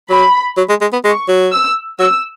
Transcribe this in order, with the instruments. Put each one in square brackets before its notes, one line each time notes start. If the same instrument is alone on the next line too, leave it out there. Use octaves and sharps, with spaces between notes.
[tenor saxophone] F#3 [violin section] B5
[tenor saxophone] F#3
G#3
G#3
B3
[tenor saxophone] G#3 [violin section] C#6
[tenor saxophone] F#3
[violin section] E6
[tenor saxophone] F#3 [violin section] E6